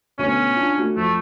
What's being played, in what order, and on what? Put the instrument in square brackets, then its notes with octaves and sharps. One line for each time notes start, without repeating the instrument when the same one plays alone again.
[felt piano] D2 B2 D#7 [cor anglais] C#4
[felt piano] D4 F4
A3 F#4
[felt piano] F2 [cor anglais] A3